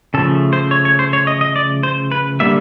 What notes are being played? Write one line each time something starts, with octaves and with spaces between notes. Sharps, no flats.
C#3 F3 A3 A4
C5
C#5
C#5
C5
C#5
D#5
D#5
D5
C5
B4
D3 G3 A#3 E5